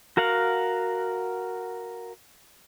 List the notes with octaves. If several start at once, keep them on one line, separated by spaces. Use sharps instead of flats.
F#4 A#4 F5 F#5